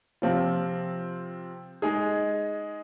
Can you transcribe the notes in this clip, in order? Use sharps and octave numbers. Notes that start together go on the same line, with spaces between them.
C3 F3 C4 F4
G#3 D#4 G#4